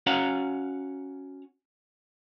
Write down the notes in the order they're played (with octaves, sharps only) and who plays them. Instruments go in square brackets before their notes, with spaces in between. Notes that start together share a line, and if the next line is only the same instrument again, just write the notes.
[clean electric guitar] C#4 F#4 C#5 F5 F#5 A#5